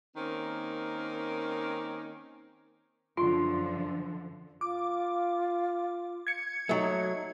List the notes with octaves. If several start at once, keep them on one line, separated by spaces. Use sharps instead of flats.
D#3 A#3 C4 C#4 A#4
F#2 D3 F3 F4 C6
F4 D6
G#6 C#7
F#3 A3 D#4